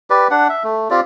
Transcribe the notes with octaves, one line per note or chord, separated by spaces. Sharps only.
G4 B4 D5
D4 F#5
E5
A3
C4 F4 G4 D5